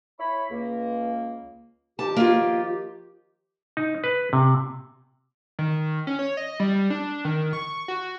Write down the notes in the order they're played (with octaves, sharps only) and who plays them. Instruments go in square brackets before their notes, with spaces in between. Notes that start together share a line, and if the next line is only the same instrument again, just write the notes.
[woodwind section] E4 C#5 B5
C#2 A#3
[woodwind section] D#3 F3 G4 [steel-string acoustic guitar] A5
[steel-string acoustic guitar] A#3 F4
[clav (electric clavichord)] D#4
B4
C3
[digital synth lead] D#3
C#4
C#5
D#5
G3
D4
D#3
C#6
F#4